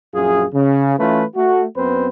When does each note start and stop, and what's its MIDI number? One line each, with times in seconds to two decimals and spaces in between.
0.14 0.45 34
0.14 0.45 42
0.14 0.45 65
0.14 0.45 68
0.54 0.93 49
0.99 1.23 52
0.99 1.23 57
0.99 1.23 61
0.99 1.23 65
0.99 1.23 71
1.35 1.65 57
1.35 1.65 66
1.76 2.08 42
1.76 2.08 59
1.76 2.08 60
1.76 2.08 71
1.76 2.08 72